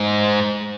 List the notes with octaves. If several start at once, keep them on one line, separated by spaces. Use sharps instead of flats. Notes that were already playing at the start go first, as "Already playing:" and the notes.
Already playing: G#2